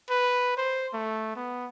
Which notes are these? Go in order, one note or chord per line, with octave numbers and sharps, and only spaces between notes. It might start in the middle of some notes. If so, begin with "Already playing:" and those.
B4
C5
A3
B3